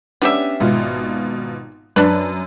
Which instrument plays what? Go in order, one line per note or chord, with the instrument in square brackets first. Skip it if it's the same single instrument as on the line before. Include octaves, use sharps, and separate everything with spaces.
[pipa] B3 G4 E5 [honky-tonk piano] C#4 D4
[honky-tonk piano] G#1 B2 F4
[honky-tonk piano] F#2 [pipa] D4 B4